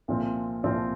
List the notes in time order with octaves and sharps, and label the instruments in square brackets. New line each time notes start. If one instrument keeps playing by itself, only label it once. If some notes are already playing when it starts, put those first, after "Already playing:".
[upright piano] C2 A#2 F3 C4
C2 A#2 F3 C4